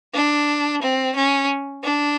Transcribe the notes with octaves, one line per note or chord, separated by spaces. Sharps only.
D4
C4
C#4
D4